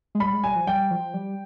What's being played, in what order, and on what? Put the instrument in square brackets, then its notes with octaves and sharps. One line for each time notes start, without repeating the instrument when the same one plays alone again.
[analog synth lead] G#3
[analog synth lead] G3 [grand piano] B5
[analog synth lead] G#3
[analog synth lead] G3 [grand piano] G#5
[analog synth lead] F3
[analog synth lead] G3 [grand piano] G5
[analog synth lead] F3
G3